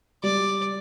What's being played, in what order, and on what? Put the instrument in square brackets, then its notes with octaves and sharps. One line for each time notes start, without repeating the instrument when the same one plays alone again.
[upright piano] G3 [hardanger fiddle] D5